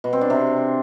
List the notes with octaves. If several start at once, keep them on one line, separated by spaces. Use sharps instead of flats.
B2
C4
D4
C3